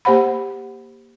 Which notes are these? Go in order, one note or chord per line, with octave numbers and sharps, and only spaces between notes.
A#3 G4 C5 F#5 B5